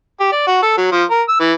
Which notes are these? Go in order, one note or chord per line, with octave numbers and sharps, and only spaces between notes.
G4
D5
F#4
A4
F#3
F3
A#4
E6
E3